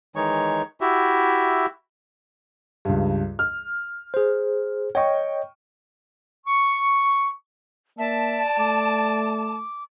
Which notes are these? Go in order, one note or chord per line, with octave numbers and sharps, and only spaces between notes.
D#3 E3 G#3 D#4 C#5 C#6
E4 F#4 G4 E5
C#2 G2
F6
G#4 C5
C#5 D#5 G5 C#6
C#6
A#3 D5 E5 A5
A3 D6